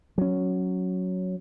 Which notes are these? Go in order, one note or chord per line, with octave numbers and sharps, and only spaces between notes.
F#3 C#4